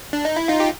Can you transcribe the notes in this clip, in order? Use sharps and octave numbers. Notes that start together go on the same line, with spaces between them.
D4
D#4
E4
D#4 F4
G4